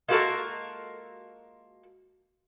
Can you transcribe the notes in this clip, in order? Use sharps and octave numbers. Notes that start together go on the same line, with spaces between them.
G#3 A#3 F4 F#4 A4 A#4